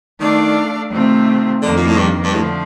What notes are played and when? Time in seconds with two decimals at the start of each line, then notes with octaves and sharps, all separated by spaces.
0.20 D#3 A3 D4 A4 D5 F5
0.90 C3 D#3 A3 C4 F4
1.62 F2 D3 D#3 A#3
1.77 A#2
1.87 A2
1.97 G2
2.24 G2
2.33 A2 D3 F3 A3